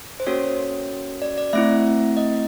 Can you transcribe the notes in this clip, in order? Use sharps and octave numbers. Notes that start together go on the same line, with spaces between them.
C5
A#3 C#4 F#4 A4 C#5
D5
D5
A3 C4 E4 E5
D#5